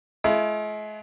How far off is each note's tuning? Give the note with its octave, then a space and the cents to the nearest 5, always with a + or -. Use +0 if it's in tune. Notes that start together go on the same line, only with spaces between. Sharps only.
G#3 +45 E4 +45